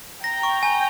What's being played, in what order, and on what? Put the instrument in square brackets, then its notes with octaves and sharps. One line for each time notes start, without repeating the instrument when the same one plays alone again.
[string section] G5 A#5 [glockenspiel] A#6
[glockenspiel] C#6
G#5